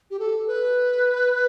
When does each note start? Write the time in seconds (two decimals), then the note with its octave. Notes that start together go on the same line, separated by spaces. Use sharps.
0.11 G4
0.19 A4
0.47 B4